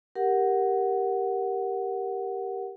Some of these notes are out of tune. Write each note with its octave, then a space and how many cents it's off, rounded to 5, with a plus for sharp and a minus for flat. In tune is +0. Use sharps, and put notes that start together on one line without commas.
G4 +0 A#4 +0 F#5 +5